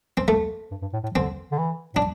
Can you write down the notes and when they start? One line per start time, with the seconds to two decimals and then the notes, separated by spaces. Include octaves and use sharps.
0.17 C4
0.28 A3
0.71 G2
0.82 G2
0.93 A2
1.03 A2
1.14 D3 C4
1.52 D3
1.59 E3
1.94 A2 D4